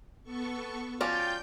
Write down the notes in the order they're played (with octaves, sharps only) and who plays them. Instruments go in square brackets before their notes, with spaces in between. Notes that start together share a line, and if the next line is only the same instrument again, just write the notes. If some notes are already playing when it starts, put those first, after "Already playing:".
[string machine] B3 A4 C#6
[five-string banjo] F3 C#4 F#4 [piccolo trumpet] F4 [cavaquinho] D5 [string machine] G5 G6